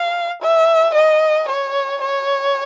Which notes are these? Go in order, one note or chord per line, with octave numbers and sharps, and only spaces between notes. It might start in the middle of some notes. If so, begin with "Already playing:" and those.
Already playing: F5
E5
D#5
C#5
C#5